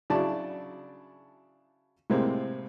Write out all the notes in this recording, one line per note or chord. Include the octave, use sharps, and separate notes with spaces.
C#3 F#3 D4 E4 D5 A5
A2 C3 G#3 A#3 C4